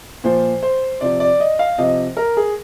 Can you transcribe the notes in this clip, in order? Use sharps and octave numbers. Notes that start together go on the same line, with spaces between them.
A#2 F3 C5
C5
C3 F3 D5
D5
D#5
F5
C3 F3 D#5
A#4
G#4